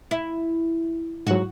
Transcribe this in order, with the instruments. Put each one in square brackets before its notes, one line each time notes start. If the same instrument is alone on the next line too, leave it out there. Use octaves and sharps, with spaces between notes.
[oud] E4
[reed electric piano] G#2 F#3 [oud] F#4